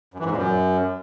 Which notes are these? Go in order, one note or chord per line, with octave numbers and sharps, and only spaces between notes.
F#2
E3
G#2
A#2
F#2